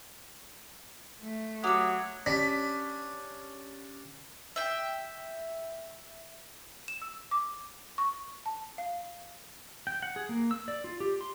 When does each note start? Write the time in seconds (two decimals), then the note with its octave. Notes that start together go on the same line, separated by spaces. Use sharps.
1.22 A3
1.64 F#3 F#4 G4 F#5 D#6 E6
2.26 C#4 D4 G4 B6
4.56 E5 G5
6.88 E7
7.02 E6
7.31 D6
7.98 C#6
8.46 A5
8.78 F5
9.87 G5
10.02 F#5
10.16 G#4
10.29 A#3
10.51 E6
10.68 D5
10.84 F4
11.00 G4
11.21 C6